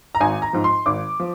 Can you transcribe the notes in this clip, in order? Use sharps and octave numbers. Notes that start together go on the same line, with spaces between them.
A#5
G#1 G#5
A#5
G#2 F3
C6
G#1 D6
F3